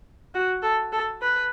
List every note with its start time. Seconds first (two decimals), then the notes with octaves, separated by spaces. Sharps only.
0.35 F#4
0.63 A4
0.92 A4
1.22 B4